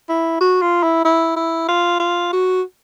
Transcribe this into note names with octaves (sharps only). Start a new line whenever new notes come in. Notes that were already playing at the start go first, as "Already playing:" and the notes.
E4
F#4
F4
E4
E4
E4
F4
F4
F#4